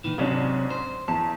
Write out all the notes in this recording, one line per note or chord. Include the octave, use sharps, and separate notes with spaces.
A#2 D#3 E3
G#2 C3 F#3 C#4 D4
C5
E2 A5